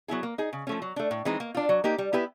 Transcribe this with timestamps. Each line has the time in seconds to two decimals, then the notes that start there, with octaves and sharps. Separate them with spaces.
0.08 F#3 B3 E4 G#4
0.23 A#3
0.38 D#4 G#4
0.53 C#3
0.67 F3 A3 C#4
0.82 F#3
0.96 A3 D4
1.11 A2
1.25 E3 G#3 C4 D#4
1.40 A#3
1.55 D4 F4
1.69 F#3
1.84 A#3 D#4 G4
1.98 G3
2.13 B3 E4 G4 B4